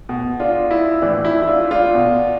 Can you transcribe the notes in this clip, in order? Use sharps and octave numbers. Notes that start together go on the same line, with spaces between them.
B2
D4 F4
E4
A2 E3 D4
E4
E4
D4 F4
D4 F4
B2